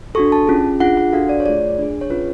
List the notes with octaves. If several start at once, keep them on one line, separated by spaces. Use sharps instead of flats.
D4 F#4 A4 C#6
A5
C#4 F4 G#4
D4 F4 G#4 F#5
F#5
D4 F#4 A4 F5
D5
C#5
A3 F4 G#4 D5
D4 G#4
C#5
C#4 F4 G#4 B4